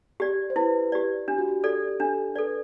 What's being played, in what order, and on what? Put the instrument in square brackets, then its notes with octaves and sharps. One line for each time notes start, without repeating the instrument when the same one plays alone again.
[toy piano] G4 D5
[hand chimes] C5
[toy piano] E4 [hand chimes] B4
[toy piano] G4 D5
[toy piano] D4 [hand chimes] G4
[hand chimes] F#4
G4
[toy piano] A4 D5
[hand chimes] G4
[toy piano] D4 [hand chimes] A4
[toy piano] A4 D5 [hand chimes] B4